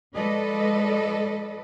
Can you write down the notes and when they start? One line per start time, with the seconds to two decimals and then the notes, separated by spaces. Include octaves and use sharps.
0.16 F3 G#3 A4 B4 D5 D#5